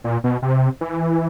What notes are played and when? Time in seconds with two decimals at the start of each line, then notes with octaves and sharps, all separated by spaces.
0.04 A#2
0.24 B2
0.42 C3
0.81 E3